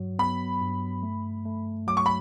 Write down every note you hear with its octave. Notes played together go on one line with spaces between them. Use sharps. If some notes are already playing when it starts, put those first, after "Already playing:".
Already playing: G2 F#3
B3 B5
G2
A3
A3
F#3 D6
C#6
B5